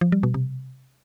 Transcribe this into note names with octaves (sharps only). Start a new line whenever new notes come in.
F3
G3
B2
C3